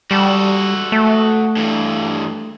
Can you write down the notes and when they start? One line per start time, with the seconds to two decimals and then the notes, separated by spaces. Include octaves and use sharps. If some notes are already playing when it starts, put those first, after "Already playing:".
0.11 G3 F#4 A4
0.92 A3
1.56 G2 E3